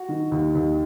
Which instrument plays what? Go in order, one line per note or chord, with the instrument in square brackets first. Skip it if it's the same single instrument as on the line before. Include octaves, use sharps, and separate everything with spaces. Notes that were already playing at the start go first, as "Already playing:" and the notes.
Already playing: [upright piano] F#4
D#3
D#2
D#2